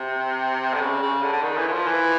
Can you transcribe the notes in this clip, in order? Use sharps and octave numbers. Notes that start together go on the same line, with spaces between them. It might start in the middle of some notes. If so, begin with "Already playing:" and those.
Already playing: C3
D3
C#3
C#3
D3
D3
D#3
E3
E3
F3
E3